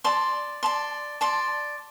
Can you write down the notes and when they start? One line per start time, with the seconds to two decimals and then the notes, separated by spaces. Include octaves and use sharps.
0.04 D5 A5 C6
0.63 D5 A5 C6
1.21 D5 A5 C6